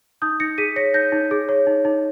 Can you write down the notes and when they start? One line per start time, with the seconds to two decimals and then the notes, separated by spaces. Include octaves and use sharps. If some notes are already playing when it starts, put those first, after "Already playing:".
0.22 D#4 D#6 G6
0.40 D#4 A#6 C#7
0.58 G#4 B6 D#7
0.76 C#5 A#6 C#7
0.94 D#4 G6 A#6
1.12 D#4
1.31 G#4
1.49 C#5
1.67 D#4
1.85 D#4